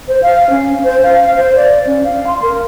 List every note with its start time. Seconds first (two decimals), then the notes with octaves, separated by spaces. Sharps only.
0.08 C5
0.22 F5
0.50 C#4
0.84 C5
1.03 F5
1.37 C5
1.56 D5
1.87 C#4
2.04 F5
2.27 C6
2.42 A#4